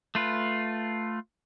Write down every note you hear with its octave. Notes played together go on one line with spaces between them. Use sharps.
A3 F4 B4